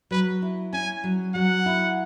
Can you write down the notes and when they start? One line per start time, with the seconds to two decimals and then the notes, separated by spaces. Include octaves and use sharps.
0.11 F#3 B4
0.42 E4
0.73 C#4 G#5
1.04 F#3
1.34 F#3 F#5
1.66 E4